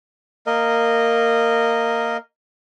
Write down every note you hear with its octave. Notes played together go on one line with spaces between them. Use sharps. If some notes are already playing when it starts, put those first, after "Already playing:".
A#3 A#4 D#5